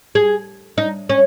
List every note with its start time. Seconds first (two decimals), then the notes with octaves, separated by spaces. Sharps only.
0.15 G#4
0.78 D#4
1.09 C#4